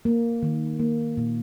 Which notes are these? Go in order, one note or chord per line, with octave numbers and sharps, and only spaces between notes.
A#3
D#3
A#3
A#2